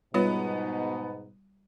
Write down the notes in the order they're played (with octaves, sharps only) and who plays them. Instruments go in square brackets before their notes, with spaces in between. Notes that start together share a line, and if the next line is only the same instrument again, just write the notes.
[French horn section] G#2 B2 D#4 [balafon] G3 F4 C#5 [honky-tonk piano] B3